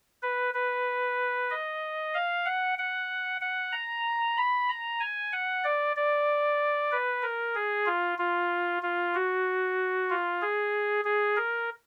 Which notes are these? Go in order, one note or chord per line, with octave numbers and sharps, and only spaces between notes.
B4
B4
D#5
F5
F#5
F#5
F#5
A#5
B5
A#5
G#5
F#5
D5
D5
B4
A#4
G#4
F4
F4
F4
F#4
F4
G#4
G#4
A#4